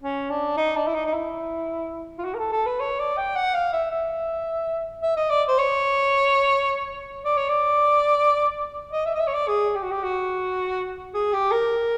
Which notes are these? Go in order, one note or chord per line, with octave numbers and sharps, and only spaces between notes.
C#4
D4
D#4
D4
E4
D#4
D#4
E4
F4
F#4
A#4
A4
A4
B4
C#5
D5
G5
F#5
F5
E5
E5
E5
D#5
D5
C5
C#5
D5
C#5
D5
D#5
E5
D#5
E5
C#5
D5
G#4
G4
F#4
G4
F#4
G#4
G4
A#4